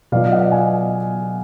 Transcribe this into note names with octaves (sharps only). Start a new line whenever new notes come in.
B2 F#3 B3 F4 D5 F5
D#5 F#5
F5 G#5